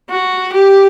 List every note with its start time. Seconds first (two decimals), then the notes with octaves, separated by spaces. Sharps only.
0.10 F#4
0.53 G4